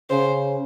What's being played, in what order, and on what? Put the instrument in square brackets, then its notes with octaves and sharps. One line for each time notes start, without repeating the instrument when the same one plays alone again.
[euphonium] C#3 [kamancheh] C5